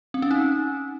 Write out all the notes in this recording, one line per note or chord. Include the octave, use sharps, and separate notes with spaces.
C4
C#4
D#4